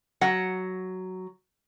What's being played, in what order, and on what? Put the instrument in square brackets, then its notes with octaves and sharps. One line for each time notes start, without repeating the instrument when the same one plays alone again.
[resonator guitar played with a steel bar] F#3 F#5